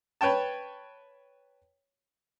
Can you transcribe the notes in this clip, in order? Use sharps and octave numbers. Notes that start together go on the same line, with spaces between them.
B4 C#5 G5 A5